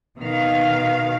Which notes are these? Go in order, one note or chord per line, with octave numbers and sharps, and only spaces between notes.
B2 D#3 F5